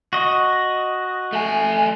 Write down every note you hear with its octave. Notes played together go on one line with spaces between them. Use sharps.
F#4 D#5
A3 G#5